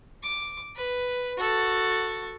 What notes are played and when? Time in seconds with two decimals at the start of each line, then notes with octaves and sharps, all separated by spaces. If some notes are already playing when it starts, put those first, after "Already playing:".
0.23 D6
0.75 B4
1.37 F#4 A4